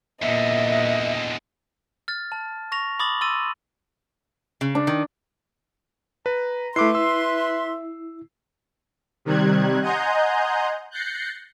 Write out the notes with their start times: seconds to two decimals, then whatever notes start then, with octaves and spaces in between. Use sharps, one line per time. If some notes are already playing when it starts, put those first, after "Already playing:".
0.22 E2 A#2 D3 D#5 E5
2.08 F6 A6
2.32 A5
2.72 C#6 A#6 F7
2.99 B5 D6 D#6 A6 F#7
3.21 C6 E6 A6 D#7
4.61 C#3
4.75 D4
4.87 D#3
6.26 B4 A#5
6.76 A3 E4 B4 E5 C6 D6 C7
6.95 E6
9.25 C3 D#3 G3 F#6 G#6
9.82 D#5 F#5 G#5 A#5 C6 G6
10.91 F#6 G6 A6 A#6 C7 C#7